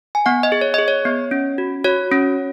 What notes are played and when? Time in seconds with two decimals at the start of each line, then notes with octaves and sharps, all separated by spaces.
0.15 G#5
0.26 B3 F#5
0.43 D#5
0.52 G#4
0.61 C#5
0.74 G#4 D#5
0.88 C#5
1.05 B3
1.31 C#4
1.58 F#4
1.84 F#4 C#5
2.12 C#4